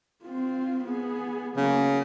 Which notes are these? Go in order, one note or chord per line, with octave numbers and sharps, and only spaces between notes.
C4 F4
B3 G#4
C#3 F#3 A#3